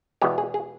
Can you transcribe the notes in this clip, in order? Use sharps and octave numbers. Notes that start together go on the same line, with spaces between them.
E2 B2 G#3 G4
G#4
G#4